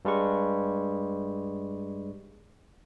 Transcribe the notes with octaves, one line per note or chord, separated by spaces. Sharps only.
G2 G3 G#3 C#6